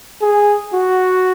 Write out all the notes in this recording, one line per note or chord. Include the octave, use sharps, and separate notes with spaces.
G#4
F#4